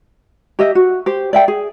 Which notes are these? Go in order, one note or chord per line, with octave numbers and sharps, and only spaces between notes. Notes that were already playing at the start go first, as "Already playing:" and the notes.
G4 D#5 E5
F#4
G4 C5
D5 E5 G5
G#4